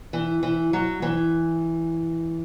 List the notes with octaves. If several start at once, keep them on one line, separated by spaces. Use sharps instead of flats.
E3
E3
F#3
E3